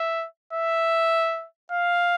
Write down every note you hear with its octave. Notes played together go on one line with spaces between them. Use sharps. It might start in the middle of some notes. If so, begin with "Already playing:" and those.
Already playing: E5
E5
F5